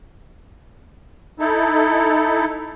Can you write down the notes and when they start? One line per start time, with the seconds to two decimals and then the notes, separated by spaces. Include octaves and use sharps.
1.39 D#4 E4 A4